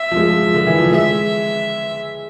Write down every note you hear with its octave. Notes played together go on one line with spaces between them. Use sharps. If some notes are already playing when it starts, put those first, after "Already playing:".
Already playing: E5
F3
G#3
F3
F3
D3
E3
F3
G#3 E5